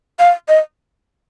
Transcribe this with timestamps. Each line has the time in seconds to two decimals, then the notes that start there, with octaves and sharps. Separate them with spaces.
0.19 F5
0.49 D#5